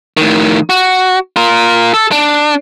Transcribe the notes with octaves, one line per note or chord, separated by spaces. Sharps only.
A2 D#3
F#4
F4 A#4
A4
D4